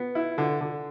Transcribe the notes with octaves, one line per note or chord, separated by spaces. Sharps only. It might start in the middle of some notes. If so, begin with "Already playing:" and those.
Already playing: B3
E4
D3
D3